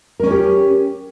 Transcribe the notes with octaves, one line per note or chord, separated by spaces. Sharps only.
C#4 G4 A#4 C#5